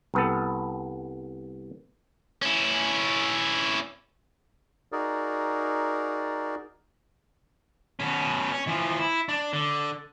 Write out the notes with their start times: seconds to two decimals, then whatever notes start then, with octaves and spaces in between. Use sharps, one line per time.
0.14 C2 B3 A4
2.42 C#4 E4
4.92 D#4 F#4 G#4 A#4 D5
8.00 B2 C#4
8.52 C#4
8.67 E3 F3
8.99 E4
9.29 D4
9.53 D3